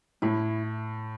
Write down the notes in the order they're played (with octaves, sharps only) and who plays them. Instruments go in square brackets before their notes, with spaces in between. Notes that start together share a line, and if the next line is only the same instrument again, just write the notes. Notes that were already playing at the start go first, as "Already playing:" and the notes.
[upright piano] A2 [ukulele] E4